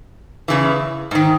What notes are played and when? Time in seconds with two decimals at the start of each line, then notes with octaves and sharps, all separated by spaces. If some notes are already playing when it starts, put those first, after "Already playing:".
0.48 E2 C#3 E3
1.11 G#2 D#3